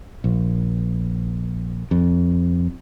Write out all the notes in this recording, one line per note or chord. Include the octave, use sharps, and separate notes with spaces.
A#1
F2